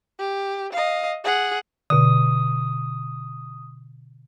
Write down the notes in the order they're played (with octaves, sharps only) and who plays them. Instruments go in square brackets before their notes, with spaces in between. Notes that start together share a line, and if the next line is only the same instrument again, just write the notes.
[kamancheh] G4
D#5 F5
G#4 F#5
[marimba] B2 D3 [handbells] D#6